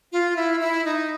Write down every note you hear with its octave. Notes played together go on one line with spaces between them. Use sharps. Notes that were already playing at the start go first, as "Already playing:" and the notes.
F4
E4
E4
D#4